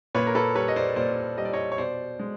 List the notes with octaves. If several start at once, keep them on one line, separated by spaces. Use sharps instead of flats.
A#2 B4 C#5
A#4
A4 B4
G3 B4 C#5
D#5
C5 D5
A#2 C5 D5
G3 D#5
D5
C#5 D#5
C#5
B2 C5 D5
G#3